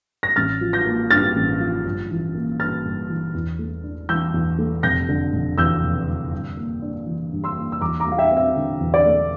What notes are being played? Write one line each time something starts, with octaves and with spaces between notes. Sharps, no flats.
A#6
A1 F6 A6
F3
G6 A#6
A#3
G2 F6 A6
A1
F3
G1
E3
A#3
G2 F6 A6
G1
E3
E2
A3
D4
E3 E6 G6
E2
A3
F1 G6 A#6
D3
F1
E2 E6 G6
F1
D3
G2
A#3
D4
E3
G2
C6 E6
A#3
E6
E2 A#5 D6
A#5 D6
A3
F5
E5 G5
C4
E5
D3
E2
D5
A3